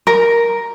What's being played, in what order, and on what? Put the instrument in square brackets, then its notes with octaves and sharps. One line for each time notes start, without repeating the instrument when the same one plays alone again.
[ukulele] A#4